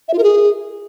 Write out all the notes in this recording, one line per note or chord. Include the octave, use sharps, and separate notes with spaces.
E5
F4
A#4
G#4